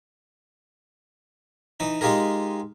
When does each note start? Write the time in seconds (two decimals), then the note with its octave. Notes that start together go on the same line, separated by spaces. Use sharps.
1.80 E3 D#4
2.01 G#3 D#4 F4 G4 G#4 A#4